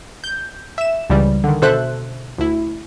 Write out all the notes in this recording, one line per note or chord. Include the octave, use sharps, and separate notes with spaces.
G6
E5 E7
C#2 C#3 E3 G3
D3 D#3
B2 D3 A4 C5 E5 F#6
D2 E4